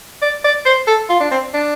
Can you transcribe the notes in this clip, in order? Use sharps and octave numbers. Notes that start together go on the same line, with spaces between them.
D5
D5
C5
A4
F4
D4
C4
D4